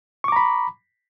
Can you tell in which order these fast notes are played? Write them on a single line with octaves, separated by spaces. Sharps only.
C#6 D6 A#5 B5